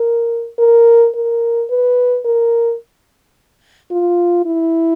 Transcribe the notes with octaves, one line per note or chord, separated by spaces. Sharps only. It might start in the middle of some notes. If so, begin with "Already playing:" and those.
Already playing: A#4
A#4
A#4
B4
A#4
F4
E4